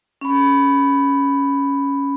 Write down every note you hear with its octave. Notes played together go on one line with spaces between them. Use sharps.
C#4 B5